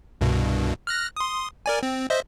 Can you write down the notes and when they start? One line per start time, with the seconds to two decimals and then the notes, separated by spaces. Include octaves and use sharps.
0.21 C2 G2 B2
0.87 F6 F#6 A#6
1.16 C6 D#6
1.66 A#4 D5 G#5
1.83 C4
2.10 C5 D#5 E5